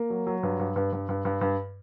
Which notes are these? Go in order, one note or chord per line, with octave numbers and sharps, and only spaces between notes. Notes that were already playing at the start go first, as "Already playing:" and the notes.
Already playing: A#3
F#3
F#3
G2
G2
G2
G2
G2
G2
G2